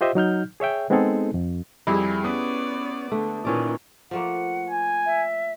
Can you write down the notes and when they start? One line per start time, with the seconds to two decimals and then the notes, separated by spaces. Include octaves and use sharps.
0.01 F4 G4 C5 D#5 E5
0.15 F#3 D#4 F6 G6
0.60 G#4 C#5 E5 G5
0.90 G#3 B3 C4 D#4 G#4 A4
1.34 F2
1.87 F2 G3 E4 G4 G#4
2.24 B3 C#4 B4 D5 D#6
3.12 D3 A3
3.45 A#2 D#3 E3 C#4 D5
4.11 F3 A3 A#3 F#5
4.70 G#5
5.06 E5